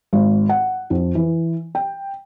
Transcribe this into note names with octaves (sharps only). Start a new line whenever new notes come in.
G#1
F#5
F2
E3
G5